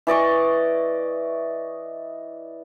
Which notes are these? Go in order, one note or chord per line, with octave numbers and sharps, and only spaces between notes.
E3 D5 D#5 C#6